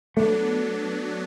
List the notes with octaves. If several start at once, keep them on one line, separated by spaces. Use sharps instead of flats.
F#3 A3 B3 D4